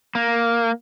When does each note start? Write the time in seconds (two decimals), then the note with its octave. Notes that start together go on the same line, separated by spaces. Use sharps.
0.15 A#3